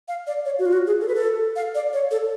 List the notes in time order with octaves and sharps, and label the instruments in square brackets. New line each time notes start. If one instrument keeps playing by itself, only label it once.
[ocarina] F5
D5
C#5
F#4
F4
F#4
G#4
A4
B4
A4
F5
D5
C#5
A4